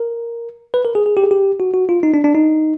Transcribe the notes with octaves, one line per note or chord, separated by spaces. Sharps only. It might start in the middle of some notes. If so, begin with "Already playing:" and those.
Already playing: A#4
B4
A#4
G#4
G#4
G4
G#4
G4
F#4
F#4
F4
D#4
D4
D4
D#4